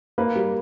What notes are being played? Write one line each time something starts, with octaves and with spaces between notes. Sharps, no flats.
A#3 B4
G3